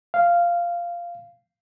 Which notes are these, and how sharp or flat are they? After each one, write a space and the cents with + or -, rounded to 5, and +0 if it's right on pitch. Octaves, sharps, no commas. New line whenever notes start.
F5 -10